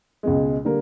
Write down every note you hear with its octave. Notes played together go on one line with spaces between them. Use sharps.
C#2 B2 G#3
D3 G3 A#3